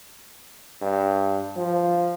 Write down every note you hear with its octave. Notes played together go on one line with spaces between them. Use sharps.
G2
F3